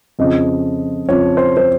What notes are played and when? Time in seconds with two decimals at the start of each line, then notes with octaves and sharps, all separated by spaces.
0.19 F2 C#3 F3 D#5
1.09 F2 C#3 F3 C#5
1.37 C5
1.57 C5